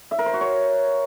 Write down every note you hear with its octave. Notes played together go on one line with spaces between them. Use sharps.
E5
A#4
C5
F#4
C#5